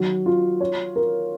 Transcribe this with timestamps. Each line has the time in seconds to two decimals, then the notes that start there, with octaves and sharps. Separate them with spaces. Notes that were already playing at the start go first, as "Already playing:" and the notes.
Already playing: D#3 F#3
0.26 F4
0.61 C#5
0.96 A#4